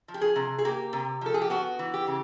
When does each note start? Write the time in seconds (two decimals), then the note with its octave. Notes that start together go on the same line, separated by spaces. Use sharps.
0.08 F3
0.14 G4
0.21 G#4
0.36 C3
0.58 G#4
0.65 A#3 G4
0.93 C3
1.21 F3 A4
1.34 G#4
1.42 G4
1.50 B3 F#4
1.79 E3
1.94 G4
2.07 C#3